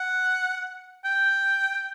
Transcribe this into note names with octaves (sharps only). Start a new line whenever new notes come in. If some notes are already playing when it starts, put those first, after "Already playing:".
Already playing: F#5
G5